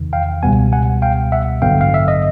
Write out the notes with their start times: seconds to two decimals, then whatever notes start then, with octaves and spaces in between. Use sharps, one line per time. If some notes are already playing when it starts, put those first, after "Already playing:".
Already playing: E2 C3 D#3
0.13 F5 G5
0.43 C#2 B2 G3 B3 F#5 G#5
0.73 F#5 G#5
1.02 F5 G5
1.32 E5 F#5
1.62 A1 G2 D3 F#3 B3 F5 G5
1.81 F5
1.94 E5
2.08 D#5